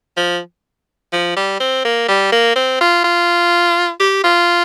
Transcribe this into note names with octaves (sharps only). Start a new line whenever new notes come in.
F3
F3
G3
C4
A#3
G3
A#3
C4
F4
F4
G4
F4